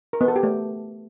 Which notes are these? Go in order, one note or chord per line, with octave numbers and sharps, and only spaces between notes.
A#4
B3
A4
G4
A3